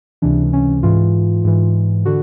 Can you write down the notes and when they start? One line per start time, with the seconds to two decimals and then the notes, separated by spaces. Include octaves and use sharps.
0.22 C#2 C3 E3 D4
0.53 C#4
0.83 G#2 E3 F4
1.44 G#2 E3
2.05 D3 F#4